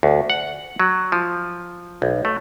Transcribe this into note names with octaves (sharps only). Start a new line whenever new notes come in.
D2
F#5
F#3
F3
B1
A3